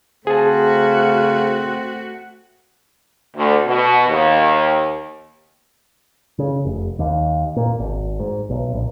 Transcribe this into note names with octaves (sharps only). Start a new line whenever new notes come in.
C#3 A3 C4 F#4 G#4 A5
D2
B2
D#2
C#3
F1
D#2
A#2
G#1
G#2
B1
A#1